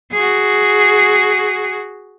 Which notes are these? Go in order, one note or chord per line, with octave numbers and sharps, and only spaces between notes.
F#4 G#4